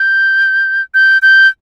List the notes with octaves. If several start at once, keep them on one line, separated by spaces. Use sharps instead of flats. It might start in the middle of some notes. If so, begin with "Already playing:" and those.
Already playing: G6
G6
G6